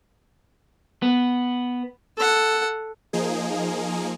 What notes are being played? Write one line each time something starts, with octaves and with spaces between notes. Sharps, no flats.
B3
A4 F#5
F3 A#3 D#4 G#4